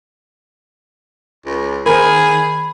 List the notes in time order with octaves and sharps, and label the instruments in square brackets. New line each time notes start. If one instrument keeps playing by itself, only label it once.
[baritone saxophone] C#2
[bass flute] D#3 [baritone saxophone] G#4 [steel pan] A#4 C5 [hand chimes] B5